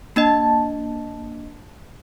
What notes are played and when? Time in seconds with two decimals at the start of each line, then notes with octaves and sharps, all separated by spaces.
0.16 A#3 D4 D#5 A5